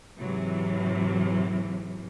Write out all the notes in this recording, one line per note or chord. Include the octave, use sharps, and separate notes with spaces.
G#2 C3 E3 F#3